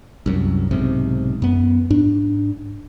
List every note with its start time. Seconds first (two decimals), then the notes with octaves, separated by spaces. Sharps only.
0.26 C2 F#2
0.71 B1 G#2 C3
1.42 F#2 B3
1.91 G#2 D4